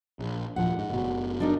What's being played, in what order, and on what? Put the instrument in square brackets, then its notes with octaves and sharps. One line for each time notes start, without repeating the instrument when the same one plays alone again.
[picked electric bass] A#1
[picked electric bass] D#1 A#1 F3 [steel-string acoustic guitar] F#5
[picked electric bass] G#2
F#1 B2
[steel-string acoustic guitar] D4 D#4 A#4